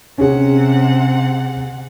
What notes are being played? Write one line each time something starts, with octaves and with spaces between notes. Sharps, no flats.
C3 C#4 G#4 F#5